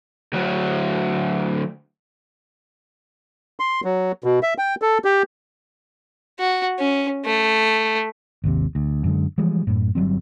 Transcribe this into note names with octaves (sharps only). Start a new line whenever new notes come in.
D2 F#3
C6
F#3
B2
E5
G5
A4
G4
F#4
C#4
A3
G#1 D#2 C3
D2
F#2 D3 G#3
E3 F3 G3 G#3
F#2 A2
G1 F#3 G3 C4